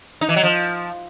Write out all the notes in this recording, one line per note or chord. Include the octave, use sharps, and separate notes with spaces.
D#4
E3
F#3
F3